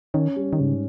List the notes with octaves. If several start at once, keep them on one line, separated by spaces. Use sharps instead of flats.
D#3 C#4
G3
D#3
G#2 C#3